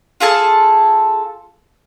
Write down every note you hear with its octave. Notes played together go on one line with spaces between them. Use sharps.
F4 G#4 A4 A5